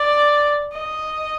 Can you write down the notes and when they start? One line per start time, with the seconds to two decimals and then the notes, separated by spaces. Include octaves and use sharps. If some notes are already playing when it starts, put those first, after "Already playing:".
Already playing: D5
0.73 D#5